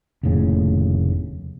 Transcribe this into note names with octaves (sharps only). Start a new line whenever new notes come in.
F1 D#2 A2 C#3